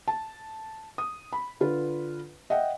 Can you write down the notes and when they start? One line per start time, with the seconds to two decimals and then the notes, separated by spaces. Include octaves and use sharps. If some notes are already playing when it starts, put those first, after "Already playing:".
0.08 A5
0.98 D#6
1.33 B5
1.60 D3 F4 B4
2.50 D#5 E5 F#5 G5